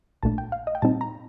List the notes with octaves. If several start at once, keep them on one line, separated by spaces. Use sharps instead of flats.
A#1 A#2 A3 D4 A5
G5
F5
D#5
G5
A#2 G3 C4 D#4 A5
A#5